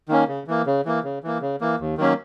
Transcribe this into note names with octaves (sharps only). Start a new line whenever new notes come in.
D#3 A#3 C#4
C#3
E3 A#3
C#3
E3 A#3
C#3
E3 A#3
C#3
E3 A#3
D#2
D#3 F#3 A#3 C#4